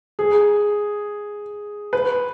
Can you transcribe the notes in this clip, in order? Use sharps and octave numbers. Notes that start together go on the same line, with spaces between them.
G#4
B4